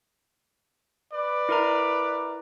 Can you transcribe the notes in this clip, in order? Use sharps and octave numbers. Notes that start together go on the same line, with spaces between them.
B4 D5
E4 A#4 A#5